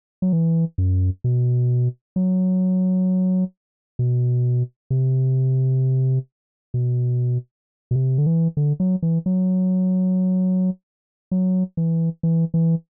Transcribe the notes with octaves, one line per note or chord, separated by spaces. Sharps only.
F#3
E3
F#2
B2
F#3
B2
C3
B2
B2
C3
D3
E3
D3
F#3
E3
F#3
F#3
E3
E3
E3